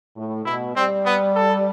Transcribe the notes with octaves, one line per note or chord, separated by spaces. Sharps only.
A2
B2 E4
G3 C4
B3
A4